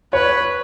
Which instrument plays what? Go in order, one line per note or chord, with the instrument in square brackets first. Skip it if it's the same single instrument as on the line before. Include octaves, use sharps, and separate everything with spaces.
[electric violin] B4 [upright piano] C#5